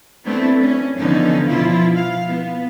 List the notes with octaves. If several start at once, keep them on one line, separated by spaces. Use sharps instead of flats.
A3 B3 C4 D4 E4
C#4
D3 E3 F3 B3 C#4 D#4
B2 F3 E4 F4
F5
B3